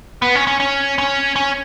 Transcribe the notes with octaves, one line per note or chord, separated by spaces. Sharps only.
B3
C#4
C#4
C#4
C#4
C#4